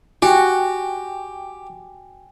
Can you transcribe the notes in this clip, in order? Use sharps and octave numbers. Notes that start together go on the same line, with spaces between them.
F#4 G4 G5 G#5